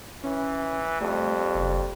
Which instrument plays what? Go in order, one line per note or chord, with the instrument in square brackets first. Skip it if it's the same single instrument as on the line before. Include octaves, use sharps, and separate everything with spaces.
[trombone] E3 [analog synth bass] C#4
[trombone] F2 [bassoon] G3 [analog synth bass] A3
[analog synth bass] F#1